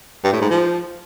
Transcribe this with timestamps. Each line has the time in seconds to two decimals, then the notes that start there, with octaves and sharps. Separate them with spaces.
0.24 G2
0.32 A2
0.41 G#2
0.50 F3